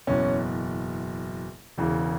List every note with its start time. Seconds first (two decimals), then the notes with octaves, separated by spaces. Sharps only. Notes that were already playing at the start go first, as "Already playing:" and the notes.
0.07 F#1 E2 B2 C#4
1.78 E1 E2 C#3 E3